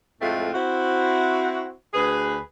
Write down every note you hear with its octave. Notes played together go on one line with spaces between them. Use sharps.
F2 A2 G#3 A3 C4 F4
C4 E4 F#4
D2 G#4 B4